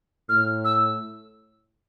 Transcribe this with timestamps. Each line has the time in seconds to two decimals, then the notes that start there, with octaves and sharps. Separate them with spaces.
0.29 A2 F6
0.65 E6